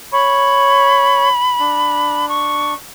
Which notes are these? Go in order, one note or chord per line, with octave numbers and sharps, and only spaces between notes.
C#5 B5
D4
C#6